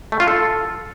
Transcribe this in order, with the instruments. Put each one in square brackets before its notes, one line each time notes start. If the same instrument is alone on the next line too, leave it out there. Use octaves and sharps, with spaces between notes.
[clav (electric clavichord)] A3
F4
A4